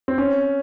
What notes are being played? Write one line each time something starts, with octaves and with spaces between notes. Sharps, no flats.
C4
C#4